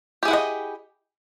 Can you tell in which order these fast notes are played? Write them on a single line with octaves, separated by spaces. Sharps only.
G4 G#4 E4 F#5 D#5